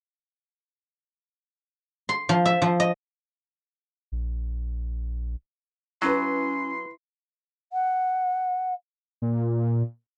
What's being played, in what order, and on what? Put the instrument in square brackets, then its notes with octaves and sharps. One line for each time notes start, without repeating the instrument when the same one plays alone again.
[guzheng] C6
F3
E5
F3
D#5
[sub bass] A#1
[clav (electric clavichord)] F#3 [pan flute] C#4 [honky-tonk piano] E4 B4 [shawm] C6
[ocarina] F#5
[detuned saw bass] A#2